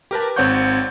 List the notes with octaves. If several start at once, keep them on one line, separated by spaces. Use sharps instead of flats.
G4 A#4 B4 A5
G#1 C4 C#5 F#5 C#6 G6